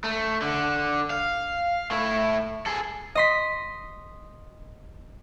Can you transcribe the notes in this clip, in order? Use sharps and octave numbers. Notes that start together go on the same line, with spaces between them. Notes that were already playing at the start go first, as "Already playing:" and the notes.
A3
D3
F5
A3 E4
G#4 A4
D#5 C6 B6